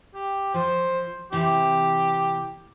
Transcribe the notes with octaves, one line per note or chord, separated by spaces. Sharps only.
G4
F3 C5
C3 E3 C4 G4